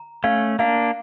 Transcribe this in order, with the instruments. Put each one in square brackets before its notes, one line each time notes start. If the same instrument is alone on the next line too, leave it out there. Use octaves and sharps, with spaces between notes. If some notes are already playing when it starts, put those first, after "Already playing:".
Already playing: [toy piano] A#5
[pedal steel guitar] A3 C#4 [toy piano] F5
[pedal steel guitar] A#3 D4 [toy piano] F5